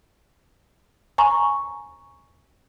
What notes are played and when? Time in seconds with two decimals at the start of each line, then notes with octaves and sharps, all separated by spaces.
1.18 G#5 A#5 C#6